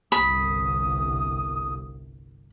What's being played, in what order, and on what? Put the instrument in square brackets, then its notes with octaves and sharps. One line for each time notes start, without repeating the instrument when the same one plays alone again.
[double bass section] G1 C2 [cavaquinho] B5 [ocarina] D#6